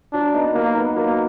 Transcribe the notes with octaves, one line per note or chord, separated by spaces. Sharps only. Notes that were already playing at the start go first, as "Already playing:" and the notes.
F#3 D4
B3 D#4
F#3 A#3
B3 D#4
F#3 A#3